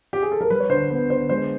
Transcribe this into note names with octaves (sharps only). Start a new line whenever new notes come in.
G4
G#4
A4
A#4
G3 B4
C#5
D3 C5
B3 B4
D3 C5
G#3 C5